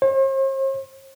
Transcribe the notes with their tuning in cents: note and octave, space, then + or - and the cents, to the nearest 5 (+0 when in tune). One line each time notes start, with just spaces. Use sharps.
C5 +45